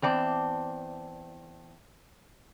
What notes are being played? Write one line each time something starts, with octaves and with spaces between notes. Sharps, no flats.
E2 C4 D5 A5